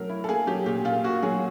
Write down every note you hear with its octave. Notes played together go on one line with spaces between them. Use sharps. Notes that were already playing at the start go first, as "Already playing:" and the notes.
Already playing: F#3 A3 A#4
E4
A4
A#3 G#4
F#3 G4
A#2 G4
A#2 F4
A#3 F#4
F#3 G#4